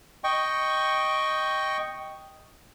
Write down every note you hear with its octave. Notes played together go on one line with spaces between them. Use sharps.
D#5 G5 C#6